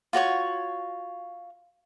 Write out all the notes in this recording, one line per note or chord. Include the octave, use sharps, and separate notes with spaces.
F4 F#4 C#5 C#6